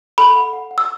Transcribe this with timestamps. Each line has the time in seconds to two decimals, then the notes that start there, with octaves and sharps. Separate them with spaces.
0.18 A4 B5
0.36 F#5
0.53 F#5
0.71 F#5
0.78 E6